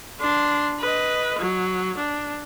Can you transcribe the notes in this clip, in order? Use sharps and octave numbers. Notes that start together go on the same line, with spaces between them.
D4 C6
B4 D#5
F#3
D4